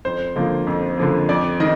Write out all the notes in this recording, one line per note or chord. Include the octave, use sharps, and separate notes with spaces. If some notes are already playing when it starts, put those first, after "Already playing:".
F2 C5
D3 F3 A#3
F2
D3 F3 A#3
F2 D5
D#3 D#5